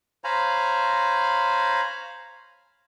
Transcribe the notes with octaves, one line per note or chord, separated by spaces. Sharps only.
C5 C#5 F5 G#5 A#5 B5